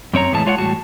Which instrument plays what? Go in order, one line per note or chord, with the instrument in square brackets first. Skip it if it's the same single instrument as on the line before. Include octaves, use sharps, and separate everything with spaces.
[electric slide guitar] F#2 C4 C#5 A#5
E2 A2 E3 G#3 A5
G#3 F4 C#5 D5 F#5
E2 A2 G3 F#4 A5